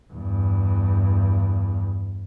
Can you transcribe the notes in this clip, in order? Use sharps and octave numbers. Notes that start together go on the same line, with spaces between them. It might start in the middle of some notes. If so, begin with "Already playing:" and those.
E2 G2